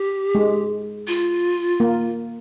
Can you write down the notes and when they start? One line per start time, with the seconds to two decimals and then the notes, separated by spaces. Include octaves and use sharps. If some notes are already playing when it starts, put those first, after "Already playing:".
Already playing: G4
0.35 G#3
1.08 F4
1.80 A#3